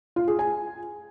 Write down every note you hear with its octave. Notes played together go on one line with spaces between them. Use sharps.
F4
G#4
G#5